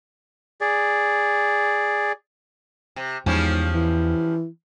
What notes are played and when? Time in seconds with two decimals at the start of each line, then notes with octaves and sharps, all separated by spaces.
0.61 G#4 D5
2.96 C3
3.26 E2 G#2 F3 G3 C#4
3.74 E3